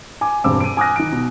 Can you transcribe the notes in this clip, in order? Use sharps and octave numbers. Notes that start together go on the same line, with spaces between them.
G#5 D6
E1 G2 C4 D6 E6
D7 D#7
G#5 D6 D#6 F6 F#6 A#6
D#3 D7
B2